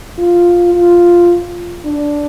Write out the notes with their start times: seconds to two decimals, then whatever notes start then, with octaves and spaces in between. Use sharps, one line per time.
0.19 F4
0.74 F4
1.85 D4